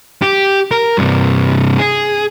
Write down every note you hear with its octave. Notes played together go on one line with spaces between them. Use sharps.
G4
A#4
G2 C3
G#4